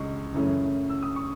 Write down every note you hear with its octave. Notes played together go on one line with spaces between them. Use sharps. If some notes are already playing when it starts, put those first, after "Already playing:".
Already playing: C#2 C#3 D#5 C#6
F#2 C#3 E3 A3 C#4
E6
D#6
C#6